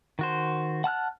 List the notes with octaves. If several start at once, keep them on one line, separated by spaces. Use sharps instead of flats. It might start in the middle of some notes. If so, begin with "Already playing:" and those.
D#3 F#4 C5
F#5 A5 F6 F#6